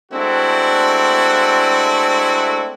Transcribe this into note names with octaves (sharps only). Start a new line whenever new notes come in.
G#3 A3 C4 D4 E4 F#4